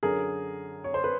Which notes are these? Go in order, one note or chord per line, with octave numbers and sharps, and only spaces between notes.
F#2 D3 G#4 A#4
C#5
C5
B4